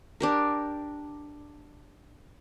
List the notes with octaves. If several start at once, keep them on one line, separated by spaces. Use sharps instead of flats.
D4 G4 A#4